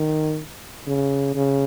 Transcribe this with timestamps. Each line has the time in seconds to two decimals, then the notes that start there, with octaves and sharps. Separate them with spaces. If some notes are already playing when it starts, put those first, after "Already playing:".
Already playing: D#3
0.87 C#3
1.35 C#3